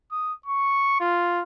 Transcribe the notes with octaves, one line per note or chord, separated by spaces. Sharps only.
D#6
C#6
F4